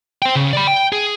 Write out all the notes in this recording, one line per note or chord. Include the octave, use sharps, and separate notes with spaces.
C5 G5
C#3
D5 B5
G5
G#4